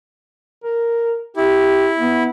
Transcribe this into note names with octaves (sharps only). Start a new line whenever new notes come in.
A#4
E4 G4
B3